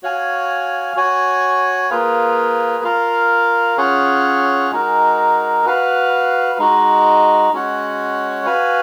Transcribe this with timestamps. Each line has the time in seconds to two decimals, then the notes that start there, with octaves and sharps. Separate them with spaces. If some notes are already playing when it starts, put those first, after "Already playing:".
0.03 F#4 C#5 F5 G#5
0.96 F#4 C#5 G#5
1.91 A#3 F4 G#4 B4 F5
2.84 F4 A#4 F5
3.77 C#4 F4 G#4 C#5 F#5
4.71 G#3 D#4 F#4 A#4
5.65 F#4 B4 F5
6.59 G#3 D#4 F#4
7.52 G#3 C#4 F#4 C#5 F#5
8.46 F#4 B4 F5 G#5